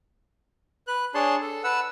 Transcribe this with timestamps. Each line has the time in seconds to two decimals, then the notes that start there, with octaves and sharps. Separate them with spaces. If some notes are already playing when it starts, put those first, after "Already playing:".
0.88 B4 F#6
1.14 D4 G#4 C#5 A5 C6
1.41 A4
1.64 B4 F#5 E6